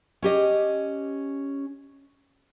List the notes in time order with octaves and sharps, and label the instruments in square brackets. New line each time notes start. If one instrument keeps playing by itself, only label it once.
[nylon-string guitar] C#4 G4 D#5